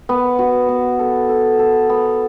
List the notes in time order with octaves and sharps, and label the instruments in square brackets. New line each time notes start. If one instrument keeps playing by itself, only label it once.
[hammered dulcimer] B3
F#4
B3
A4
A4
A4
B3